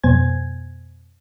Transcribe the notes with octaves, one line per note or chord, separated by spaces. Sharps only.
F2 B2 B3 C5 G#5 G#6